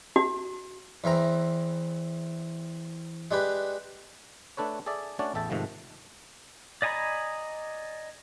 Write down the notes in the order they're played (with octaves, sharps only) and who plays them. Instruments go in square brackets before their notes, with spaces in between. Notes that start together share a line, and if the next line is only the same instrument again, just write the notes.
[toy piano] F#4
[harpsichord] E2 E3 C4 A#5
G#3 D4 G4 B4
[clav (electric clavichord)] A3 D4 A4 B4 C#5
G#4 A4 D5 E5
A3 C#4 D4 F#4 C#5 D5
A1 E2 A4 E5 G5 A5
G#2 C3 D#3 F3 A3
[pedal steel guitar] D5 D#5 G#5 A#5 B5